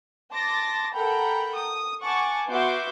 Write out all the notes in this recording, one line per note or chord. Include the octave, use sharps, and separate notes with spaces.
A5 C6 D6 A6 A#6
A4 A#4 F#5 G5 A#5 B5
D#6
F#5 G#5 A5 C#6 D6
B3 F#4 E5 C6 D6 G6